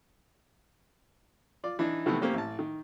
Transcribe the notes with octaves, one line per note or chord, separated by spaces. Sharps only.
F4 D5
E3 D4 D#4
C3 D#3 E3 A3 B3 E4
A#3 C4 C#4 G4 C5
A1 A5
D#3